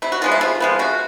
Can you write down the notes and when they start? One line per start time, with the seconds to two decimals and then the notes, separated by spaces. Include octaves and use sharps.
0.02 C3 E4
0.12 F#4
0.22 F3 G#3 B3 F4
0.32 E4
0.41 C3 F4
0.60 F3 G#3 B3
0.79 C3 F#4